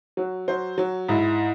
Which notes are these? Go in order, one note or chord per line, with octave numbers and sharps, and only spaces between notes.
F#3
F#3 C5
F#3
G#2 E4